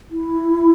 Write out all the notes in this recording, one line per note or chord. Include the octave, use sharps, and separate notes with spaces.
E4